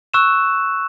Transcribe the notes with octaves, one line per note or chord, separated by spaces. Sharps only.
C#6 E6 F#6 E7